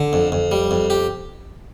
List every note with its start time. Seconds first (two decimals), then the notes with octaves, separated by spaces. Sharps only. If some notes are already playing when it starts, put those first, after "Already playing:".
Already playing: D3
0.13 F2
0.32 F2
0.51 G3
0.71 F2
0.90 G4